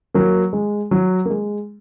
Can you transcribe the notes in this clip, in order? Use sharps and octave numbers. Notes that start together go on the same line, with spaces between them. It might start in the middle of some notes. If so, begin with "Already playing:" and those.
F#3 A#3
G#3
F#3
A#3
G#3